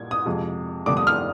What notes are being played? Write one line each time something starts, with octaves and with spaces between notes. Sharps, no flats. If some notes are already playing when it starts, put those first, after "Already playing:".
Already playing: A#1 A#2 G3 G#6
D#6
F2 C3 F3 G#3
F1 F2 D3 G3 D6
D#6
F6